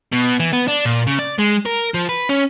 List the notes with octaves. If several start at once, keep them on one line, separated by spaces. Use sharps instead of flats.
B2
E3
B3
D4
A#2
C#3
D5
G#3
A#4
F3
B4
C#4